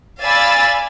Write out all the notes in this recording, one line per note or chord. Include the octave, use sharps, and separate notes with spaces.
D5 F5 G#5 B5 E6 A6